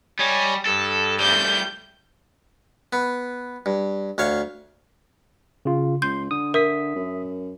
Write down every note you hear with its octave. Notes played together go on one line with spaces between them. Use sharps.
G3 C#5 D#5 G#5
G2 A4
G3 A3 G6
B3
G2
D2 C#5 F5
C#3 F4
C#2 C6 G6
D3 D#6
A#4 E5 D#6 B6
F#2